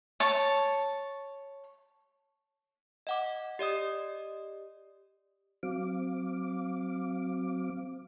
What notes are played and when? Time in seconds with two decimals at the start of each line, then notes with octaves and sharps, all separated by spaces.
0.20 C#5 A5
3.07 D#5 F#5 D6
3.59 G4 D5 D#5 D#6
5.63 F#3 C4 F5 D6